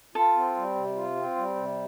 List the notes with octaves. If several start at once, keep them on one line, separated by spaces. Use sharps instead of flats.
F4 A4
C4
G3
C3
F4
C4
G3
C3